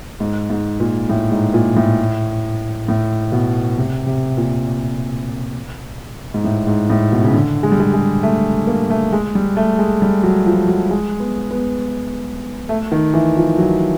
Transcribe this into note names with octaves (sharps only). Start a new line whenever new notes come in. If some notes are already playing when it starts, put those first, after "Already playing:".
G#2
G#2
A#2
A2
G#2
A#2
A2
A2
B2
C3
C3
A#2
G#2
A2
G#2
A2
B2
C#3
D3
G#3
G3
G#3
G#3
A3
A#3
A3
G#3
G3
A3
G#3
G3
F#3
F3
F#3
G#3
B3
B3
A3
D#3
E3
F3
F#3